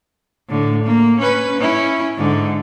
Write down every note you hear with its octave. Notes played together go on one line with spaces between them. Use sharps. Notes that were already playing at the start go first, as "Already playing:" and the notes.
A2 D3
A#3
C#4 B4
C#4 E4
G#2 D3